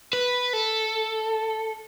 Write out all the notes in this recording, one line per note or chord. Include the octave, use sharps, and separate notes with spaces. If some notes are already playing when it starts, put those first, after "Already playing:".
B4
A4